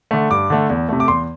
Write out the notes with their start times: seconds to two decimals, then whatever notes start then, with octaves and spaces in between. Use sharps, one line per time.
0.11 D3 A3
0.30 G2 D6
0.50 D3 A3
0.70 E2
0.89 C3 A3
1.00 D6
1.08 E2 C6